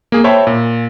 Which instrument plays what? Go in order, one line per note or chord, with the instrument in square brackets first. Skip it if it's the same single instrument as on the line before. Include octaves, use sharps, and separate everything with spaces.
[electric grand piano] A#3 G#4
C5 C#5 E5 G5 A5 B5
A#2